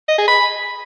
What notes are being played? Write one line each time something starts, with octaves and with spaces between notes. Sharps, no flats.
D#5
G#4
B5